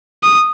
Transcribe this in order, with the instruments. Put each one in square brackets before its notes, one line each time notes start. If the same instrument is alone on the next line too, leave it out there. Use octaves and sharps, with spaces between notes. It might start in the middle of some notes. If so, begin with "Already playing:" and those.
[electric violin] D#6